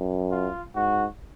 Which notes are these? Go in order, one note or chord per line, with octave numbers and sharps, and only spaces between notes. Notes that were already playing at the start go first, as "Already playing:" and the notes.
Already playing: F#2
F4
G#2 F#4